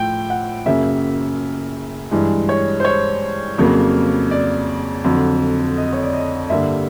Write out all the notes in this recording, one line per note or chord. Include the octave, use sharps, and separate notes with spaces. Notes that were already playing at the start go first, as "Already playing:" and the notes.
Already playing: A2 F3 A3 G5
F#5
F#2 C#3 F#3 A#3 E5
G2 E3 G#3
C#5
C5
C#5
F2 C#3 F#3 A#3
D5
F2 D3 F#3
D#5
C#5
D5
D#5
G2 D3 G3 A#3 E5